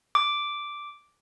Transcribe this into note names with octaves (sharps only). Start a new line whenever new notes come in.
D6